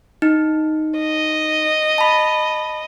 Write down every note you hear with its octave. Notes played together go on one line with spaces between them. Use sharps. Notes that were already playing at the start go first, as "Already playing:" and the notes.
D#4
D#5
A5 B5